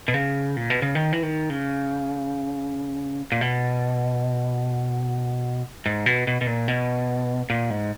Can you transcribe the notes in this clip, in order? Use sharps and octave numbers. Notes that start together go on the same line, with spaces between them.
B2
C#3
A#2
B2
C#3
D#3
E3
D#3
C#3
A#2
B2
G#2
B2
B2
B2
A#2
B2
A#2
G#2